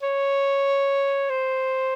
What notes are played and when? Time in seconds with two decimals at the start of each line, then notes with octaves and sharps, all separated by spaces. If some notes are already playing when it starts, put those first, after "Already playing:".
0.03 C#5
1.29 C5